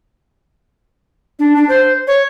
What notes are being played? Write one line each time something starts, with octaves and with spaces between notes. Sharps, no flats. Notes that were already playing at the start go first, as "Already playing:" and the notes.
D4
D4
C5
C#5